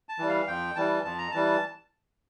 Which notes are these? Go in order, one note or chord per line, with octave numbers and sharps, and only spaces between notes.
A5
E3 G3
F5
F2 G5
E3 G3 A5
F2 A5
A#5
E3 G3 A5